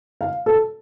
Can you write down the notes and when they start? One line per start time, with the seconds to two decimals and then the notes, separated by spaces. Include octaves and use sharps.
0.21 F5
0.46 A4